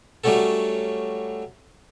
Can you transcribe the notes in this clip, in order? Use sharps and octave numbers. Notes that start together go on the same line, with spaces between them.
F#3 G3 A3 C#4 F#4 A4